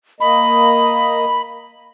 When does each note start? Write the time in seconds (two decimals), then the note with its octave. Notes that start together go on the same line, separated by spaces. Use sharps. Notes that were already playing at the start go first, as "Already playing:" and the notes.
0.20 A#3 D#5 B5